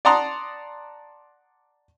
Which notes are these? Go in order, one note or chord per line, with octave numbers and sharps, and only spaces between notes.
D5 F#5 A5 A#5 C6 D#6